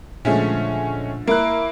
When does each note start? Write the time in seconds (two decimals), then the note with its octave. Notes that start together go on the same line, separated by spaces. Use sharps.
0.25 A#2 D3 F3 G#3 A3 C#4
1.27 A#3 E4 A#5 F#6